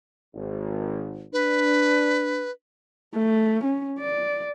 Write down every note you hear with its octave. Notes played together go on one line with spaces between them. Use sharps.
G#1
D4 B4
A3
C#4
D5